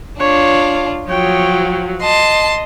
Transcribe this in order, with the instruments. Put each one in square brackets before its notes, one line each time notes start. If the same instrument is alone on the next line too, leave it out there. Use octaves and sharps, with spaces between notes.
[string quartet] D4 F4 [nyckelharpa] C#5
[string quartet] F3 F#3 [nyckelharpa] C#5 G5
[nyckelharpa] D#5 [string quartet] A5 C6